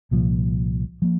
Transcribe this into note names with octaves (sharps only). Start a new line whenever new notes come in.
C2 A#2 F3
F3 A#3